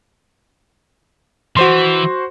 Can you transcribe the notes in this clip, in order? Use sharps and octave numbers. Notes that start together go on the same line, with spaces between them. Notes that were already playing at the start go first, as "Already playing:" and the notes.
E3 F#4 C5 C6